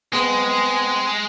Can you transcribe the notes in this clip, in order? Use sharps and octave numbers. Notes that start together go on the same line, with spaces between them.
G#3 B3 C4 G#4 B4